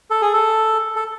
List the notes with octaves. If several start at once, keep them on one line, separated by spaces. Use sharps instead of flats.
A4
G#4
A4
A4